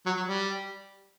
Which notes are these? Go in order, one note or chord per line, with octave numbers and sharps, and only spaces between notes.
F#3
F#3
G3